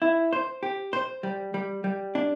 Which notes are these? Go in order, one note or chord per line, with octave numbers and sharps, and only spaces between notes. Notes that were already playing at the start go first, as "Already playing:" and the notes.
E4
C5
G4
C5
G3
G3
G3
D4